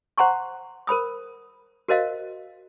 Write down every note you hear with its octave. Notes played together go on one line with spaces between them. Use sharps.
C5 F#5 A#5 C6 C#6
A#4 C5 B5 D#6
F#4 A#4 C5 D#5 F5